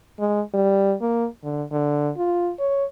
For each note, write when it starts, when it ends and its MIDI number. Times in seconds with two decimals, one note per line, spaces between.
0.20 0.41 56
0.54 0.95 55
1.02 1.27 58
1.43 1.63 50
1.72 2.11 50
2.17 2.51 65
2.59 2.85 73